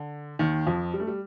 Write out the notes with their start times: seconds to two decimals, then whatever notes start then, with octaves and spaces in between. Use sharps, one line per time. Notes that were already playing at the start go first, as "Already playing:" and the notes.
Already playing: D3
0.39 D#2 D#3
0.66 F2 F3
0.93 G3
1.00 A3
1.07 G3